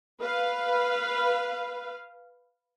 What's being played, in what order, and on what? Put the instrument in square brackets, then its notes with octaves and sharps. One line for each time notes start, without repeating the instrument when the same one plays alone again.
[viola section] B4 F5